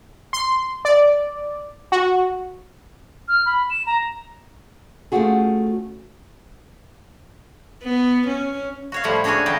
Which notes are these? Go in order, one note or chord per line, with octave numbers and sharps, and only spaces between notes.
C6
D5
F#4
F6
B5
E7
A#5
A3 C4 C#4 F4 F#4 G#4
B3
C#4
F#4 C#5 F5
A2 F3 G3 A3 E4 F#5
C#4 D4 F#4 G#4 C#5 G#5
C#3 E3 F#3 D#4 G5 A5